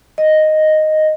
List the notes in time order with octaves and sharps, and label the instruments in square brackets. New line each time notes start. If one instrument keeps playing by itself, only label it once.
[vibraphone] D#5